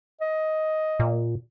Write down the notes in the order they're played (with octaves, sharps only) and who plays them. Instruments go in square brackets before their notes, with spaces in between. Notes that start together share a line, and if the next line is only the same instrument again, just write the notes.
[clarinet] D#5
[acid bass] A#2